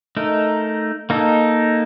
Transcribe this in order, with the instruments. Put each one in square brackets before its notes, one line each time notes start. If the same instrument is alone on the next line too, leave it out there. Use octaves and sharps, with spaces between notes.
[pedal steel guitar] A3 D#4 A#4
A#3 D#4 A4